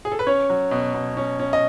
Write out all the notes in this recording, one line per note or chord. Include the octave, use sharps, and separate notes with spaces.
G#4
A4
B4
C#4 C#5
F#3
B2
B2
C#4
C#4
D#5